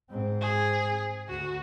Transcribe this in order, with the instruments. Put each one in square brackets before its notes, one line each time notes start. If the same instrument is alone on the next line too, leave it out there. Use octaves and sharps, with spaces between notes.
[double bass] G#2 C4
[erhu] G#4
[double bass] D2 [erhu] F#4